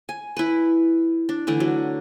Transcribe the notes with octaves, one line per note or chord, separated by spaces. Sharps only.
G#5
E4 B4
D4
D3 E3 A3 D4
F#3